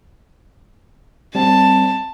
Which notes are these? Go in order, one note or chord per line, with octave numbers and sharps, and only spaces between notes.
G3 C4 A5